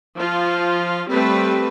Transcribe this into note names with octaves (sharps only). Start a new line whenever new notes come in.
F3 F4
G3 A3 C4 B4